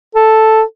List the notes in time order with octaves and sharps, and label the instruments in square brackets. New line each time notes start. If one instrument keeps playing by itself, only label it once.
[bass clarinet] A4